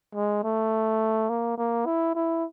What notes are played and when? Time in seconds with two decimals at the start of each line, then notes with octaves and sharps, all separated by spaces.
0.15 G#3
0.44 A3
1.29 A#3
1.58 A#3
1.86 E4
2.15 E4